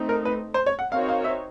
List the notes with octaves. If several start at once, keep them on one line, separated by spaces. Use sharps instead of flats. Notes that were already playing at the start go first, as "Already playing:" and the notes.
Already playing: A3 C4 D#4
A#4
B4
C5
C#5
F#5
C4 D#4 F#4 A#4 C#5 F5
F5
E5